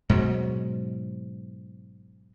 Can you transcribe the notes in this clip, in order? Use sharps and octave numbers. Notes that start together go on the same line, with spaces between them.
G#2 B2 F#3